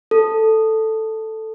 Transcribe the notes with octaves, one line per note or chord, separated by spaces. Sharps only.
A4